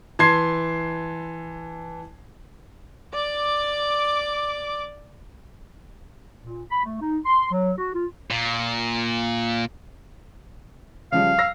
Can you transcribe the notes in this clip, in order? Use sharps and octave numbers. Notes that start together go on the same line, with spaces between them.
E3 A5 C6 G#6 C7
D5 D6
A#2
B5
A3
D#4
C6
F#3
F#4
F4
A#2
C#3 F3 G3 F5
E6 A#6 C7